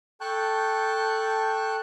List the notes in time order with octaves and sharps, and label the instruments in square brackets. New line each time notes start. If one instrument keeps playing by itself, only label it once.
[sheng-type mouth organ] A4 G5 A5 C#6 F#6 G6